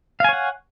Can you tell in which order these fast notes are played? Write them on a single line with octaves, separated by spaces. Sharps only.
F5 G#5 C#5 F#5